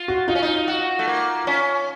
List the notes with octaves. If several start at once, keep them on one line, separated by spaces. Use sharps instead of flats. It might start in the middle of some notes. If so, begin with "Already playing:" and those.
Already playing: F4
F#4
D#4 F4
C#4
D#4
F#4
A3
A#3
C#4